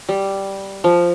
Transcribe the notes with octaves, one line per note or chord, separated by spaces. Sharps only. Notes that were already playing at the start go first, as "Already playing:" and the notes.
G3
F3